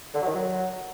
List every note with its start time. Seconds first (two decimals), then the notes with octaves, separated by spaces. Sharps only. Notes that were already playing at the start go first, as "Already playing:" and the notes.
0.14 D3
0.21 F#3
0.27 D#3
0.33 F#3